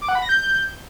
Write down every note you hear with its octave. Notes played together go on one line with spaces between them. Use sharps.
D6
F#5
B5
A#6
G6